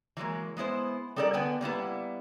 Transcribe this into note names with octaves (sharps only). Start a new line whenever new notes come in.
E3 F#3 G#3 A#3
G#3 B3 E4 C5
G3 D#4 A4 A#4 C5 D5
D3 B3 G5 G#5
G3 A#3 B3 E4